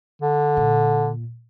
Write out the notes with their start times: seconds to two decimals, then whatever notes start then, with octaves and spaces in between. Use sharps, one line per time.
0.22 D3
0.57 A#2